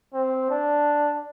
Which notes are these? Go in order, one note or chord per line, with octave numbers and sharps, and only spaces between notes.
C4
D4